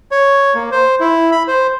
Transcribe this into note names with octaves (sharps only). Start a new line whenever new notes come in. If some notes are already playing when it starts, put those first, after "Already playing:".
C#5
A#3
C5
E4
B5
C5